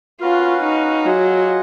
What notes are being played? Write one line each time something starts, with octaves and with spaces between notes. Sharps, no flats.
C#4 F4 F#4 B4 F5
D#4
F#3 F4 G#4 D#5 F#5